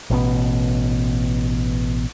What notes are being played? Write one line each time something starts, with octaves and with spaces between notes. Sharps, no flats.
A1 B2